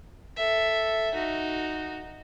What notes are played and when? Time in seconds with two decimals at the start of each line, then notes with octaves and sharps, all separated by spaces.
0.37 A4 E5
1.14 D#4 F#4